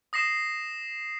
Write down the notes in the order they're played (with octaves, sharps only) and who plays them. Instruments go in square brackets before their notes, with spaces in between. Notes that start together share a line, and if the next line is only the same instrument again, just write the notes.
[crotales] D#6 A#6 C7 E7